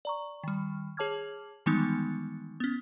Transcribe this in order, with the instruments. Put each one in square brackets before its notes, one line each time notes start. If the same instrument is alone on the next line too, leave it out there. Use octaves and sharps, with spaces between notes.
[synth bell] D5 A#5 C#6
D#3 G3
G#4 C#5 A5 D6 F6 G#6
D#3 E3 G3 G#3 B3 D#4
B3 C#4